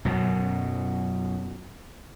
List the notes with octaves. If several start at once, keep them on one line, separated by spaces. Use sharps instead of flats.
F#2 B2 F#3